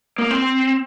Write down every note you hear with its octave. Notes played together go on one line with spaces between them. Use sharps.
A#3
C4